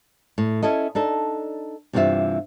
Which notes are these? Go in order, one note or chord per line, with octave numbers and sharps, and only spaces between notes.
A2
C#4 E4 A4 D#5
D4 D#4 A4
G2 C3 E3 A3 F4 E5